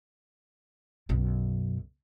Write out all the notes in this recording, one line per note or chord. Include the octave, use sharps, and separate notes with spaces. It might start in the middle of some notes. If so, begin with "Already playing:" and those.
B1 F#2